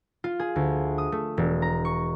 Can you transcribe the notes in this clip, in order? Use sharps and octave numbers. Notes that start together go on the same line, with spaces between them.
F4
G#4
D2
D#6
A3
E1
A#5
C#6